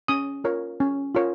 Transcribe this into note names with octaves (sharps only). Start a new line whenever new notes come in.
C#4 D#6
F4 A#4 C#5
C#4
F4 A#4 C#5